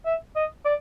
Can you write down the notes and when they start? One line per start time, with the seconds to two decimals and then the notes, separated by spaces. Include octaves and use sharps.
0.06 E5
0.36 D#5
0.65 D5